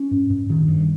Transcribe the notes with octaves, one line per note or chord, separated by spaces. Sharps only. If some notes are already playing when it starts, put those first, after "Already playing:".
Already playing: C#4
G2
G2
G2 D#3
G2